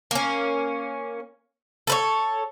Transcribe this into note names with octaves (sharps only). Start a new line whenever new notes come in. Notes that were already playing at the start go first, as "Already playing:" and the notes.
A#3 C#4
A4 B4 C#5